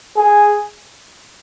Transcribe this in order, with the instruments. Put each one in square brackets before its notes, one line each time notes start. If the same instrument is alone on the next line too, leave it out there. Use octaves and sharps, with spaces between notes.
[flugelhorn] G#4